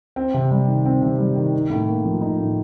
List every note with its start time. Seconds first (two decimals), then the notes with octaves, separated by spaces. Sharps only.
0.16 C4
0.34 C3
0.51 G3
0.68 D#3
0.85 C4
1.02 C3
1.19 G3
1.36 D#3
1.53 D#4
1.70 A2
1.88 A#3
2.05 F3
2.21 D#4
2.39 A2